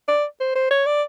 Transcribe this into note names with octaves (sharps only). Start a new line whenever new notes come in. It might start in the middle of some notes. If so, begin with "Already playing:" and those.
D5
C5
C5
C#5
D5